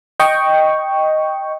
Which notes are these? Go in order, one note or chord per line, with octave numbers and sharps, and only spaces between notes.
D#5 G5 C#6